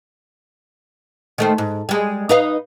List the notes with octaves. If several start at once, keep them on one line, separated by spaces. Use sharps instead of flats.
D#3 A3 C5
G#2
G3 G#3
D#4 B4 F5